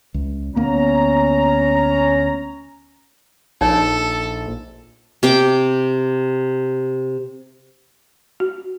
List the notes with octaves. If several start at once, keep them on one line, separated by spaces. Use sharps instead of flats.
C#2
D2 A#3 B3 C#4 A#5
A#1 D#4 A4 C#5 G#5
C3 G5 D6
F#4